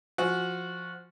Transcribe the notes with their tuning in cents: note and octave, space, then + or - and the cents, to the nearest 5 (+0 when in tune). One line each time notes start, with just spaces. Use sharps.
F3 +0 F#4 -10 G#5 +15